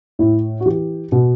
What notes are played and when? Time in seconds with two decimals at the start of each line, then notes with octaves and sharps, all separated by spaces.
0.19 A2 E4
0.60 F#4
0.66 E3 G4
1.12 B2